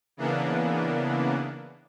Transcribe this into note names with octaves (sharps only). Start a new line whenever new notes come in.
C#3 E3 A#3 B3 D4